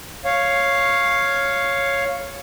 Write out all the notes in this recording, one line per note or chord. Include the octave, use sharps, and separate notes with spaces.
C#5 F5